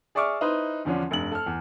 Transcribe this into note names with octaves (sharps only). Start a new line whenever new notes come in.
G#4 D5 E5 C#6 D6 F6
D#4 E4 B4 C5
E2 D3 F3 C#4 D4
F1 G2 F#7
A4 F6
E2